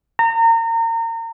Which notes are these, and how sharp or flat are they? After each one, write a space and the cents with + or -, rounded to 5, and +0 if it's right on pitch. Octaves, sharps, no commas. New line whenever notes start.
A#5 -30